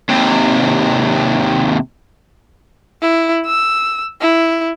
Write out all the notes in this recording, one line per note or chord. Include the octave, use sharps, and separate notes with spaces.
D#2 C3
E4
E6
E4